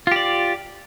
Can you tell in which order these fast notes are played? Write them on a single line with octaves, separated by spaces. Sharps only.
F4 G4 D5